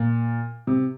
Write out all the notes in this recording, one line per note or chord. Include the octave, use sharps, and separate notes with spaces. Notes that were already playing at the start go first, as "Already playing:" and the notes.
Already playing: A#2
C3